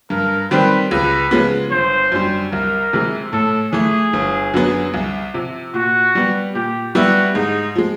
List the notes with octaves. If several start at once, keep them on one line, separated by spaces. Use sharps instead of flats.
G2 A#4
D#3 G3 C4 B4
C#2 B4
C#3 F3 G#3 B3
G1 C5
F#2 D3 G3
C2 A#4
C3 E3 G#3
A2 A4
E3 A3 G#4
G1
F#2 D3 F#3 B3
C2
C3 F3
A#2 F#4
G3 B3
A#2 G4
G3 B3 E4 F#4
G#2 D#4
F3 G#3